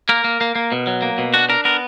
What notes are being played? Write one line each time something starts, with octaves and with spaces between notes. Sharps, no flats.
A#3 A#4
A#3
A#3
A#3
B2
F#3
A#3
B2
D4 F#4
D4 A#4
B3 A#4